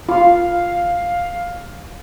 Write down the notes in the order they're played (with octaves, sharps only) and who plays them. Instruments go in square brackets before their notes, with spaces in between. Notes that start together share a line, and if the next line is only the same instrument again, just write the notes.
[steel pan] F4 [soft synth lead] F5